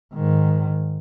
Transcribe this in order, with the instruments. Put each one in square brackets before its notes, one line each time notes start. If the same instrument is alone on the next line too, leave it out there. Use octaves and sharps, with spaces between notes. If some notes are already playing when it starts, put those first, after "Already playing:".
[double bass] G#2 D#3